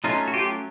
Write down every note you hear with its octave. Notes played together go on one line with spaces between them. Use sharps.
F#3 A3 C#4 D#4 F4
F#4
F4 G4